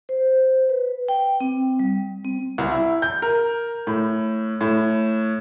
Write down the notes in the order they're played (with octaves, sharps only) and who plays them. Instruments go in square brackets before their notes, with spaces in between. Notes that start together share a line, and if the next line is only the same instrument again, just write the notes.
[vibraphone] C5
B4
G5
C4
G3
C4
[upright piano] C2
E4
G6
A#4
A2
A2